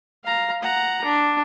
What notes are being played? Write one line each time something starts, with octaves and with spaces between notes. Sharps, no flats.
F5 A#5
F#5 A#5
D4